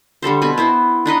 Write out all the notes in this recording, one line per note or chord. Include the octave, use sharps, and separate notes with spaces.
D3 G3 A4 C5
B2 C4 G#5 B5
B3 E4 C5
D4 D#4 B4 D#5